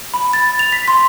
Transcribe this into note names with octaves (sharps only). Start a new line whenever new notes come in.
B5
A6
F7
B6
C6